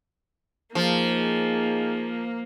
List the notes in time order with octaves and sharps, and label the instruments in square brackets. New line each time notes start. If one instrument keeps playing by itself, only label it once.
[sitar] F3 [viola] A#3 [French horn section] D#4 G#4